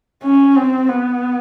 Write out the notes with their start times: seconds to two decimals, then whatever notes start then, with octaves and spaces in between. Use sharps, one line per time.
0.23 C#4
0.56 C4
0.89 B3